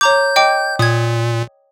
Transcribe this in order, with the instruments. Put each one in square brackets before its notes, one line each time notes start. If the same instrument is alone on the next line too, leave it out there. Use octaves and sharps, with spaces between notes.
[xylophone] C#5 A#5 D6 [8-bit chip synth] G6
[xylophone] D#5 G5 D6
[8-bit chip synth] A#2 [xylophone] D#6 G#6